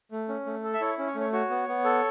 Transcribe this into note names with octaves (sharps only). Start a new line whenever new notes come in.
A3
C#4
A3
A4
E5
E4 C#5
C#4
C#5
A3
C#5
F#4 C#5
B3
B3
A4